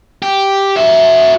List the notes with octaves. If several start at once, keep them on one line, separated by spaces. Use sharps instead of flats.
G4
F#4 E5